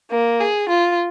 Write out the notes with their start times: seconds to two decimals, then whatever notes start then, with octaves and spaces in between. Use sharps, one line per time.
0.11 A#3
0.40 G#4
0.70 F4